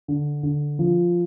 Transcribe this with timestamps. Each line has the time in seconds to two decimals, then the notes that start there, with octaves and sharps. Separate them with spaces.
0.08 D3
0.43 D3
0.79 F3